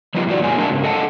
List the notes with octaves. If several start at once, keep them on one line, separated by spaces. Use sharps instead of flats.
F3 G3 B3 D#4 F4
A2 D#3 F3 F#4 D5
F#2 B2 G#3 G#5
A3 D4 A#4 D#5 A5
G#2 C#3
A4 D#5 F#5 A5